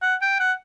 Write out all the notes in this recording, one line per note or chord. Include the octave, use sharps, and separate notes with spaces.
F#5
G5
F#5